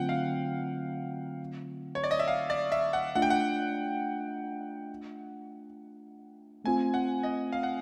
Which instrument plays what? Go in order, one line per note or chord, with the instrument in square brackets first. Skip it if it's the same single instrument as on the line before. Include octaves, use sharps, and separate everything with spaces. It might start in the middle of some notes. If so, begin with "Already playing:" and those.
Already playing: [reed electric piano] D3 F#3 A3 C4 F4 [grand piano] F#5 G5
[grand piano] F5
C#5
D5
D#5
E5
F5
D5
E5
F#5
[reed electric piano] A3 D4 F4 [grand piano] F#5
[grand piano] G5
F#5
[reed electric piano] A3 C4 F4 [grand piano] G#5
[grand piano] F#5
D#5
F5
F#5